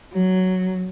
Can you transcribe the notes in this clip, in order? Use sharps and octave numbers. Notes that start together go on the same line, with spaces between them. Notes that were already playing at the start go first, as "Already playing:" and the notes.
F#3